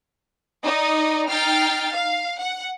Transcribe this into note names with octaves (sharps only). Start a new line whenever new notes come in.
D#4 D5 D#5
D#4 G5 F6 A6 C7
F5
F#5